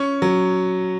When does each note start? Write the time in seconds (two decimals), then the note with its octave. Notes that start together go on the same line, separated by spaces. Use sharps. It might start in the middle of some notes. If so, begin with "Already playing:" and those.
Already playing: C#4 C#6
0.22 F#3